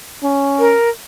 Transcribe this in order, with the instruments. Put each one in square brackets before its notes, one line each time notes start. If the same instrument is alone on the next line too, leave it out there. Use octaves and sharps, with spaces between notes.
[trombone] C#4
[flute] A#4